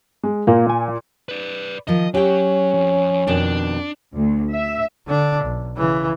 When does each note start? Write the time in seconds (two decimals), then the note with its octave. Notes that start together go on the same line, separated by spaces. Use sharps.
0.23 G#3
0.47 A#2 A#3
0.70 G#5
1.29 B4 D5
1.87 D#3 F3 D#5
2.14 F#3 C#4 G4 G5
2.74 F2
3.27 F2 B2 D#3 D4
4.16 D2
4.53 E5
5.08 D3 D4
5.44 B1
5.77 C#3 E3